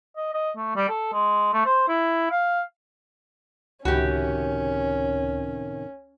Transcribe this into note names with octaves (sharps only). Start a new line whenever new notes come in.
D#5
D#5
A3
G3
A4
G#3
A3
C5
E4
F5
C#2 A2 C3 D#3 C#4 F#4 G4